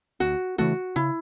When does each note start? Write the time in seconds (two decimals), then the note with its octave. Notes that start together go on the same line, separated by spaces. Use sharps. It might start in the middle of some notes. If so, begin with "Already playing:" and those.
0.20 D2 F#4
0.58 C#3 E3 A3 F#4
0.96 C#3 E4